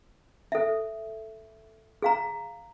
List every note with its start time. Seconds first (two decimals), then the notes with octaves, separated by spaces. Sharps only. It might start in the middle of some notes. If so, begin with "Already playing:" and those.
0.52 A4 E5
2.02 G#4 F5 A#5